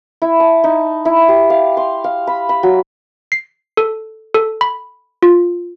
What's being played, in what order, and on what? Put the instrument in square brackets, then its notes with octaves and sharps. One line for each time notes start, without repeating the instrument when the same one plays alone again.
[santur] E4
A5
D#4
E4
G4
F5
C6
F5
B5
B5
F#3
[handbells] C7
A4
A4
B5
F4